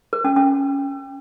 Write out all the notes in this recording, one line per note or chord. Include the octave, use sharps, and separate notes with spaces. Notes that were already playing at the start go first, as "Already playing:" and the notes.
A#4
C#4
C#4